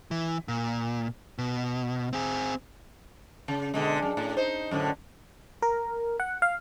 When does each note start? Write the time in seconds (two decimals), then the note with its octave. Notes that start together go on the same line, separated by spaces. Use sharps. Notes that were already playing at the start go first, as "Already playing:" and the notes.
0.11 E3
0.48 A#2
1.38 B2
2.13 C4 G#4
3.48 C#3
3.74 B2 D3 G#3
4.02 F#2
4.17 A2
4.37 D#4 C5
4.71 F#2 A2 D3
5.62 A#4
6.20 F#5
6.42 F5